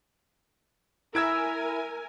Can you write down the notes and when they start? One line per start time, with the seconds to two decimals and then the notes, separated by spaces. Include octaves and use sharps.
1.15 E4 A#4 E5 G#5 E6 G#6 D7